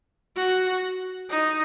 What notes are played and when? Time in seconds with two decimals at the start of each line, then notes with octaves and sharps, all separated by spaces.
0.37 F#4
1.30 D#4